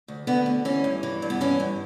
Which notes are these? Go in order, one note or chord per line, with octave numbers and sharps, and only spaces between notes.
D2
D3 B3
D2
E3 C#4
G2
E3
G2
B3
E3 C#4
G2